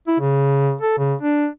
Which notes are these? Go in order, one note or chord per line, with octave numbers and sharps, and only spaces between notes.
E4
C#3
A4
C#3
D4